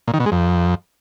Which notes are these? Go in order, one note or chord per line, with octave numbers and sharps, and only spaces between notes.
A#2
D#3
B2
G#3
F2